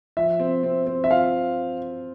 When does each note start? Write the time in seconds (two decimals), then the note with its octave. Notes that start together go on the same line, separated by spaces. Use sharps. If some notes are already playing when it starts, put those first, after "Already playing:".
0.17 F3 E5
0.39 C4
0.63 C4
0.87 C4
1.04 E5
1.10 F4 F5